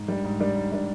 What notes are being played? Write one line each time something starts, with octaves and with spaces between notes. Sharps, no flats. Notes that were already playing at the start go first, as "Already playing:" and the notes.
Already playing: G#2
G3 D4
G#2
G3 D4
G#2
G3 D4